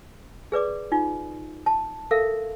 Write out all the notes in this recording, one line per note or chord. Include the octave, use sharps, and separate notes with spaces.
G#4 B4 D5 D6
D#4 F4
A5
A4 A#4 E5 F5